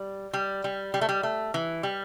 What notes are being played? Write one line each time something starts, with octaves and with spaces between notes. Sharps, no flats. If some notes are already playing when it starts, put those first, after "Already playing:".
Already playing: G3
G3
G3
G3
A3
G3
A3
E3
G3